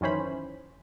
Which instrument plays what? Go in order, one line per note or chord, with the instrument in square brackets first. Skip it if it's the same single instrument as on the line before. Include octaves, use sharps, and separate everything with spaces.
[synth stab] F#2 D#3 E3 C#4 C5 B5